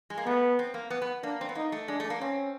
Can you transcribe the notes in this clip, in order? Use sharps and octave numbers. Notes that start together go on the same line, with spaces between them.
G#3
A#3
A3 B3
C4
A#3
B3
B3
A#3 D4
C4
B3
A#3 D#4
A3
G#3 D4
A3
A#3
C4 C#4